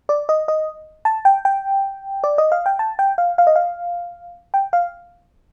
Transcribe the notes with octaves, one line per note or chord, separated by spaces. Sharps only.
D5
D#5
D#5
A5
G5
G5
D5
D#5
F5
G5
A5
G5
F5
F5
D#5
F5
G5
F5